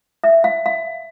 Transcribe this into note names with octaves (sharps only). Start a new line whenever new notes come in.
E5
F5
F5